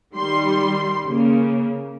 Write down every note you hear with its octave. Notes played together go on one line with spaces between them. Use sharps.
D#3 G3 C6
C#3 A#3